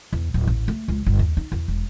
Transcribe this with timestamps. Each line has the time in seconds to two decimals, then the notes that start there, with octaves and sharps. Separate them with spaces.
0.13 E2
0.34 D1
0.47 A1
0.68 A3
0.88 C#2
1.06 G1
1.19 D#2
1.37 D#4
1.52 E2
1.68 E1